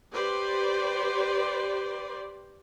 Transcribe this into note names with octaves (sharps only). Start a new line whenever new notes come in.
G4 B4 C5 D5